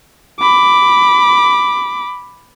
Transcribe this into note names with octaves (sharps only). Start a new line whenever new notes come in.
B5 D6